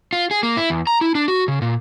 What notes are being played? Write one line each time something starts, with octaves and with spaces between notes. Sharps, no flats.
F4
G#4
A#3
E4
E2
A#5
E4
D4
F#4
C#3
A#2